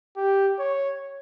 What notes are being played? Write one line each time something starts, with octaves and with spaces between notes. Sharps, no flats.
G4
C#5